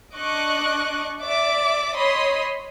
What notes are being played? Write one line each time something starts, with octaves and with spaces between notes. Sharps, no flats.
D4 D#5 C#6 D6 F#6
D5 E5 D6
C#5 D#5 B5 C6 D#6